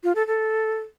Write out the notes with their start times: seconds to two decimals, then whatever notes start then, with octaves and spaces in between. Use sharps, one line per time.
0.04 F4
0.15 A4
0.27 A4